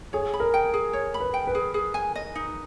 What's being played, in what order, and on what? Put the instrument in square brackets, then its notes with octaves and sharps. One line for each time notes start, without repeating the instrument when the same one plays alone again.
[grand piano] G#4 [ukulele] C#5
[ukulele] B5
[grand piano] A#4
[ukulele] G5
G#4
C#5
B5
[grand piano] B4
[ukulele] G5
[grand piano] B4
[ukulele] G#4
G#4
G#5
D#5
D#4